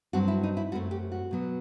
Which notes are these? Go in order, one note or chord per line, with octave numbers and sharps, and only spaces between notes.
G2 F#3 C4 F#4
E4
D#4
E4
F#2 F#3 A3 C4 F#4
G4
F#4
B2 F#3 B3